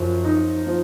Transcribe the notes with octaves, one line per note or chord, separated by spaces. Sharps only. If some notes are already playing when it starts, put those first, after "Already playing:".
Already playing: F#2 F3
D#4
F3